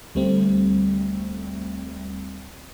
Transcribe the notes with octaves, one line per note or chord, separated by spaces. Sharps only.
D2 G3 A3 C4